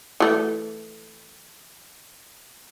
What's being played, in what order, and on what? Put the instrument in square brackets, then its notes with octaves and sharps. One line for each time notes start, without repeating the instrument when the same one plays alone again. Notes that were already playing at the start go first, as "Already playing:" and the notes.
[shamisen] E3 A3